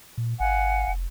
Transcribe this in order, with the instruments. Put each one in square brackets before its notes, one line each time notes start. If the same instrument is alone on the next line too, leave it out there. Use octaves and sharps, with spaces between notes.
[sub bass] A#2
[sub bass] G#1 [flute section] F5 F#5 G#5
[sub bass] F1